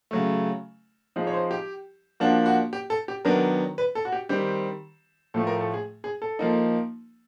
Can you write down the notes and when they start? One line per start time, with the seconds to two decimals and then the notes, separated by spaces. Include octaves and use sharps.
0.11 C#3 F#3 A3
1.16 F3 G#3 C4 D#4
1.27 C#5
1.34 C5
1.51 G4
2.20 F3 A#3 D4 F#4
2.46 F#4
2.73 G4
2.90 A4
3.08 G4
3.25 D#3 F#3 B3 D4 A#4
3.78 B4
3.95 A4
4.05 F#4
4.12 G4
4.29 D#3 G3 C4 G4
5.34 A2 F3 A3 A4
5.47 A#4
5.61 A4
5.74 G#4
6.04 G#4
6.22 A4
6.39 F3 A#3 D#4